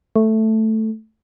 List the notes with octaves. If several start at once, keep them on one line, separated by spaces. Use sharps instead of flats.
A3